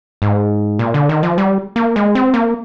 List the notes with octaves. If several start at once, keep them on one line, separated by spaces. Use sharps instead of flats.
G#2
A#2
D3
D#3
F3
G3
A#3
G#3
C4
A#3